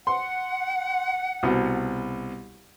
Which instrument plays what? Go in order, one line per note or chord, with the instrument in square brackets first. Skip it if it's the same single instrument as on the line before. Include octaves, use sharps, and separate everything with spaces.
[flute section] F#5 [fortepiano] C6
[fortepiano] C2 B2